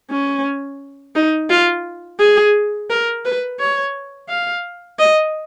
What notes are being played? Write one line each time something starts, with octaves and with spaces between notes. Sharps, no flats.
C#4
D#4
F4
G#4
A#4
B4
C#5
F5
D#5